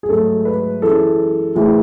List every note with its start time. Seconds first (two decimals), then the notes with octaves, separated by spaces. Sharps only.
0.03 G#4
0.09 G#2 F#3 A3 A4
0.45 B4
0.82 F#2 E3 G#3 A4
1.55 A2 E3 G#3